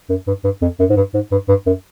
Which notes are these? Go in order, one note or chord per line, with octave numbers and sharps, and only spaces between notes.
F#2
G2
G2
F2
F#2
G#2
G2
G#2
G2
G2
F#2